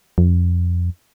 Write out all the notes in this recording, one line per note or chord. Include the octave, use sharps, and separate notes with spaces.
F2